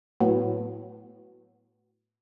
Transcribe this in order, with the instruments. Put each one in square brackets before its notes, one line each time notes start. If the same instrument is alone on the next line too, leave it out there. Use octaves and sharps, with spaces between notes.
[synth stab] A2 F#3 B3